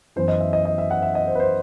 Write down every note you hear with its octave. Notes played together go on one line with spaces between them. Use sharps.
F#2 E3 B3 C5
D#5
E5
D#5
D#5
E5
F#5
E5
D#5
C5
B4
C5